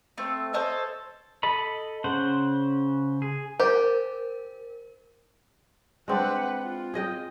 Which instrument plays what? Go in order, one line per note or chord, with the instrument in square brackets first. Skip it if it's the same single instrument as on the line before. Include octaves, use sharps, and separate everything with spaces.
[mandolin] A3 C4
A4 C5 C#5 D#5
[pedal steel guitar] A4 D#5 B5
C#3 C5 F#5
G#4
[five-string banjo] G4 [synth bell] A#4 [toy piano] C5
[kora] G#3 C4 D4 [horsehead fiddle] B4 F#5
[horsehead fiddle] F4
[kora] G#4 D#5 G5